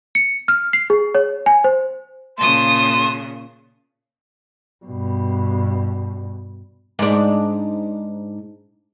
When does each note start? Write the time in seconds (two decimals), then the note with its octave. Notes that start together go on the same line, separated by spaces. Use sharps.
0.15 C#7
0.48 F6
0.73 C7
0.90 G#4
1.15 C#5
1.46 G#5
1.64 C5
2.38 A#2 C#3 A5 C6 D#6
4.85 G2 B2
6.99 G#2 D4